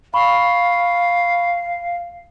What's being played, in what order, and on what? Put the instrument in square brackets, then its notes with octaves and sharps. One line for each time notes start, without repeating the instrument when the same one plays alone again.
[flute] F5 [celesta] B5 C#6